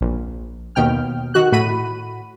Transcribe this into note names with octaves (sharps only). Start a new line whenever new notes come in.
A#1
D#2 B2 G5 F6
D#3 F#4 F#6
A2 F#4 B5 D#7